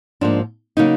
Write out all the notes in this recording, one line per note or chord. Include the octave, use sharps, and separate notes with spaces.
G#2 F3 A#3 D4
C#3 F#3 A#3 D#4